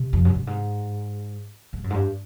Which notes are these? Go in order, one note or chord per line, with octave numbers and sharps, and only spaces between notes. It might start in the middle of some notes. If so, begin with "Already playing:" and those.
Already playing: C3
F2
F#2
G2
G#2
G#2
F#2
G#2
G2